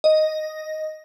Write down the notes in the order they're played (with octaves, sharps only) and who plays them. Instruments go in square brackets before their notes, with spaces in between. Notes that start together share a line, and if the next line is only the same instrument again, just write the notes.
[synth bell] D#5